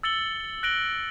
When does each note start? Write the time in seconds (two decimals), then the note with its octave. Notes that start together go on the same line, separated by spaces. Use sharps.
0.03 E6 A6 C#7 F#7 G7
0.63 F#6 A#6 D7 F#7 G7